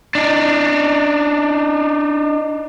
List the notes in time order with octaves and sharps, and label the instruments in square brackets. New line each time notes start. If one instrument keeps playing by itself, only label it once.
[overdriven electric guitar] D4 D#4